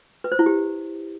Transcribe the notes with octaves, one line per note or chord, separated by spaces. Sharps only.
B4
C5
E4
G4